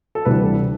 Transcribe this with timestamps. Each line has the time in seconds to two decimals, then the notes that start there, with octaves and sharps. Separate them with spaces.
0.15 A4
0.25 D2 C3 E3 G3 B4
0.43 A4